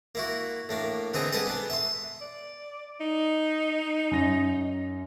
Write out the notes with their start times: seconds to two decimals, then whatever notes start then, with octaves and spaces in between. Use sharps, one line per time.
0.15 A#3 E4 F#4
0.69 A2 A#3 D4
1.14 D3 B3 C4 D#4 G#4
1.33 G3 G#4 A4 B4 F#5
1.46 B3 D4
1.70 E5 C6
2.21 D5
3.00 D#4
4.11 F#2 A#6